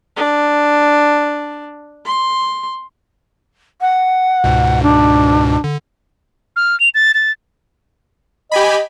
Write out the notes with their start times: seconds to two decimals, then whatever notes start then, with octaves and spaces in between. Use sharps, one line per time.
0.17 D4
2.06 C6
3.81 F#5
4.44 C#2 G#2 B2
4.83 D4
5.64 D3
6.56 F6
6.80 F7
6.94 A6
7.14 A6
8.51 G4 D#5 G#5 B5